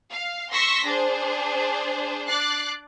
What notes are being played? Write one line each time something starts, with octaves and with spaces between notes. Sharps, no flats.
F5
C6 C#6 E6 A#6 B6
D4 G#4 C5
D4 D6 F#6 A6 C7